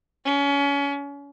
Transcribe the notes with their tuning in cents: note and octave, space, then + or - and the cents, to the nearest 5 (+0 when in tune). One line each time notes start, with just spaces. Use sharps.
C#4 +30